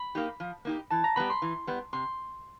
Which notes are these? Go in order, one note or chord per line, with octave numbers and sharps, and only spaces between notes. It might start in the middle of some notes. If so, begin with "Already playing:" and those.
Already playing: B5
A#3 D#4 G4
F3
A#3 D#4 G4
E3 A5
A#5
G3 B3 B5
C6
E3
G3 B3
C3 C6